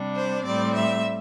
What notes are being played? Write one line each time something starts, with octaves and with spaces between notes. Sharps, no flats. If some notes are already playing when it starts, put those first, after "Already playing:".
Already playing: C3 G3 D4
C5
A2 G3 C4 D5
E5